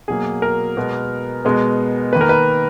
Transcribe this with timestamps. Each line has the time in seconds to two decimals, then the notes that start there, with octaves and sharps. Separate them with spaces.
0.08 B2 F#3 A#3 G#4
0.42 A#4
0.77 B2 G#3 B3
1.45 B2 G#3 B3
2.13 D#3 A#3 B4
2.21 A#4
2.29 B4